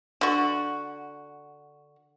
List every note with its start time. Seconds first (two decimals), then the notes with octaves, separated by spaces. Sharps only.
0.21 D3 F#4